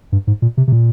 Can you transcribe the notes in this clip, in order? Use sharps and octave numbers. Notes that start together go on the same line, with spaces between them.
G2
G#2
A#2
C3
C3
A#2